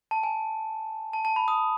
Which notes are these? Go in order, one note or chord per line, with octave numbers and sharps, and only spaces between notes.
A5
G#5
A5
A5
B5
D#6